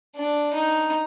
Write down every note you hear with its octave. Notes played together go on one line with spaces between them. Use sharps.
D4
D#4